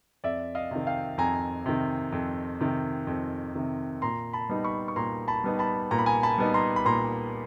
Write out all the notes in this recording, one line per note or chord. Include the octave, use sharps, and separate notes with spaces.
F2 D5 E5
D#5 F5
C3 D#3
F5 G5
F2 G#5 A#5
C3 D#3
F2
C3 D#3
F2
C3 D#3
A#2 A#5 C6
A5 B5
G3 B3 D#4
B5 C#6
C#6
A#2 A#5 C6
A5 B5
G3 B3 D#4
A5 B5
A#2 A#5
B5
G#5 A#5
A5 B5
G3 B3 D#4
A#5 C6
B5
A#2 A#5 C6